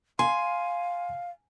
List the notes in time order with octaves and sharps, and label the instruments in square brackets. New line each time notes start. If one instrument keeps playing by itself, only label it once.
[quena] F5 [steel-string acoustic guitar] G#5 [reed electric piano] C6